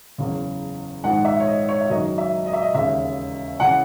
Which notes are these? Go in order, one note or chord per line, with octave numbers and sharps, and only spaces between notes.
F#1 E2 C#3
A#1 G#2 D#3 F#5
E5
C#5
D#5
C#5
E5
F#1 F#2 D#3 D#5
E5
D#5
E5
D#5
E1 D#2 C#3 E5
C#3 E3 F#5